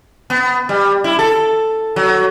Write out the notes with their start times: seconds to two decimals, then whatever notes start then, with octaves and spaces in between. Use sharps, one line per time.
0.30 B3
0.69 G3
1.04 E4
1.19 A4
1.96 F#3